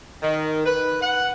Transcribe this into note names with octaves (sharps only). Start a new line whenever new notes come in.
D#3
B4
F#5